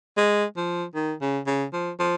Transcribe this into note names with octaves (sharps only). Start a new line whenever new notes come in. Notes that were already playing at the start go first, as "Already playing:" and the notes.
G#3
F3
D#3
C#3
C#3
F3
F3